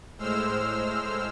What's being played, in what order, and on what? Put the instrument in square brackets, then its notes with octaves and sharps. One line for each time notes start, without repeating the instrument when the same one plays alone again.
[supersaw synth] A2 G#3 C5 E6 F6